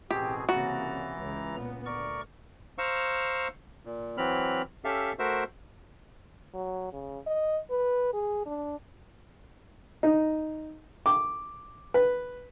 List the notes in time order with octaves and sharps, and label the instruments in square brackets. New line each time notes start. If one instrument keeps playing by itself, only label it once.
[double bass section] A1 [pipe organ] B2 C4 G#4 [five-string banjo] G4
[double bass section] C2 C#3 A#3 [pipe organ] E3 A#5 A6 [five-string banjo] F#4
[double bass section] C#2
A#2 B3
[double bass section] D2 [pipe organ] A#4 D5 C#6
[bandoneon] C5 F5 A#5 C#6 E6
A#2
E3 F#3 C4 B5 F6
C#4 G4 A4 E5 F5
A3 F#4 A#4 C5 E5
[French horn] F#3
C#3
D#5
B4
G#4
D4
[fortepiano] D#4
D6
B4